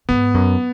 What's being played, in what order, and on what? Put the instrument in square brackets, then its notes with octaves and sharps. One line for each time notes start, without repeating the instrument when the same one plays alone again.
[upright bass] G#2 [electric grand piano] B3
[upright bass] F#2